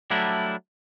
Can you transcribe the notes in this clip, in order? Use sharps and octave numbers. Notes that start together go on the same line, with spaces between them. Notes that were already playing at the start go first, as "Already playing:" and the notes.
F#3 G3 A3 D4 E4